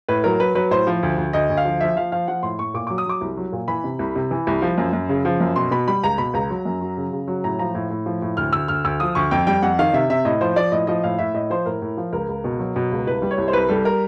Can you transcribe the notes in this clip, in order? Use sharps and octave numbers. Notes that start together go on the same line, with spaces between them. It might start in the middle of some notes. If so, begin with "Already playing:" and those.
A2 B4
F#3 A#4
F#3 B4
F#3 B4
A2 C5
F3
D2
D2
D2 D#5
D2
F5
F3
F3 E5
F3 F5
F3 F5
F3 F#5
A2 C6
A2 C#6
A#2 D6
F#3 D6
D#6
F#3 D6
C2
F#3
A#2
E3 B5
C3
C2
C3
E3
C2
F3
F#2
F#2
C#3
F3
F#2
B2 C6
B2 B5
G3 B5
C#2 A#5
B2 B5
C#2 A#5
F#3
F#2
F#3
C#3
C#3
F#3
A2 A#5
F3 A#5
A2
A2
F3
A2
D2 F6
D2 E6
D2 F6
D2 E6
F3 D#6
D2 C#6
F2 G5
G3 G5
F2 F#5
D#3 F5
C3 E5
C3 E5
A2 D#5
F3 C5
F3 D5
A2 D#5
F3 D#5
A2 F5
A2 E5
A2 D#5
F3 C5
A2 A#4
A2
F3
C#2 A#4
C#2
B2
F#3
B2
C#2
C2 B4
G3
C#5
C2
C5
C2 B4
G3 A4
A#4